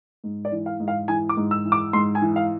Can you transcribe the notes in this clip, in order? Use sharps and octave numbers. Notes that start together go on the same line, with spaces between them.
G#2
D5
E3
F5
G#2
F5
E3 G#5
D6
G#2
E6
E3
D6
G#2 C6
G#5
E3
F5